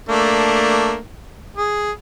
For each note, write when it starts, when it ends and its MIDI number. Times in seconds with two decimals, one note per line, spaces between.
0.09 0.99 57
0.09 0.99 58
0.09 0.99 62
1.57 1.91 68